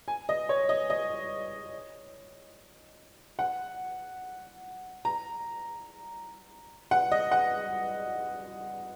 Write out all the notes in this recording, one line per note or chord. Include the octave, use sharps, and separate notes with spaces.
G#5
D#5
C#5
D#5
D#5
F#5
A#5
F#5
D#5
F#5